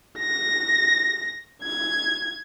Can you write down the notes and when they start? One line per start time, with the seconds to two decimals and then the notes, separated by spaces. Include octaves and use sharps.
0.19 A#6
1.63 G#6